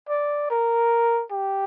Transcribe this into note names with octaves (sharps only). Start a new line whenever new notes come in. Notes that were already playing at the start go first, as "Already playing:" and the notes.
D5
A#4
G4